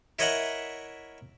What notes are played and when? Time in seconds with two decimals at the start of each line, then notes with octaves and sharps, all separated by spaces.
0.19 E4 A#4 C#5 D#5 E5 F#5